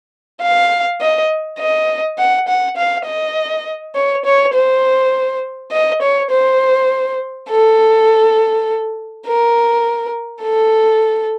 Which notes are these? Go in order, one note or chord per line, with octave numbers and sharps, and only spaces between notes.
F5
D#5
D#5
F#5
F#5
F5
D#5
C#5
C#5
C5
D#5
C#5
C5
A4
A#4
A4